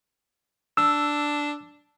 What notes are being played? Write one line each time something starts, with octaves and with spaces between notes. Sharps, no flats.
D4 E6